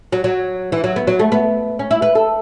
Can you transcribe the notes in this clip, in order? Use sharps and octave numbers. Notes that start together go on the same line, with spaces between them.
F#3
F#3
E3
F#3
B3
F#3
A3
B3
C#4
E4
B4
A4